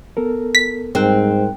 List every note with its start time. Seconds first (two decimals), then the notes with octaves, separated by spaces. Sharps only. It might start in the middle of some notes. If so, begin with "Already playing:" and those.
0.17 B3 A4 A#4
0.55 B6
0.95 G#2 G3 C4 A#4 F#6